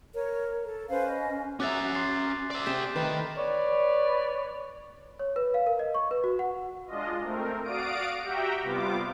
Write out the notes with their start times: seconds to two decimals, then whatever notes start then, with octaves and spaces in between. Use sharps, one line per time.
0.14 A#4 C#5
0.64 A4
0.89 C#4 B4 C5 F5
1.06 D#5
1.60 C#4 F#4 G#4 E5 A#5 D6 F#6 A6
1.94 C6 A6 C7
2.50 D5 E5
2.66 C3 G4 G#4 G6 B6 E7
2.96 C3 D#3 A3 B4
3.38 B4 C#5 D5
5.19 C#5
5.36 B4
5.54 F5
5.67 A#4
5.79 D#5
5.95 C#6
6.11 B4
6.24 F#4
6.39 F#5
6.87 G#3 D4 F4 D#5
7.21 A3 C4 A#4
7.63 F#4 D5 F5 D#6 D7
8.22 F#4 G4 E5 G5 A#5
8.62 C3 G3 B3 F4 D6